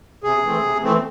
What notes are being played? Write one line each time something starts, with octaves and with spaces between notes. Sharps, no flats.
C3 G#4
E3 A3 C4
C3
E3 A3 C4